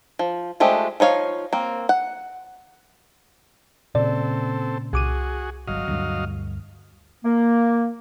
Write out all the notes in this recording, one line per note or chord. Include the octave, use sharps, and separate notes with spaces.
F3
F3 G#3 A3 D4 G4
F3 D#4 C#5 F5
A#3 C4
F#5
A#2 C#3 C4 A4 D5
C2 F#4 G#4 D6 D#7
G1 F#3 D#5 F5
D2 G2
A#3